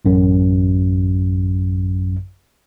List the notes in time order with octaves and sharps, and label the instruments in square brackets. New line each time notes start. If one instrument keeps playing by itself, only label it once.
[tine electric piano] A1 F#2